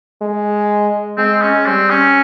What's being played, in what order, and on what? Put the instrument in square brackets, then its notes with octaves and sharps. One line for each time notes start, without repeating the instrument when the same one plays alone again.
[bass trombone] G#3
[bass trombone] G#3 [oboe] C4
[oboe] C#4
[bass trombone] G3 [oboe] C4
[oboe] C#4